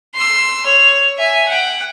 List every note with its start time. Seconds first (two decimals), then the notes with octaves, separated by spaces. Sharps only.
0.15 C6 E6
0.66 C#5
1.18 E5 G#5
1.49 F#5 G5